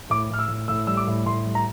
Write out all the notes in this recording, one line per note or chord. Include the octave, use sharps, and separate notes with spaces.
A2 D6
A2 F6
E6
A2
A2 E6
G3 E6
D6
A2
A2 C6
G3
A#5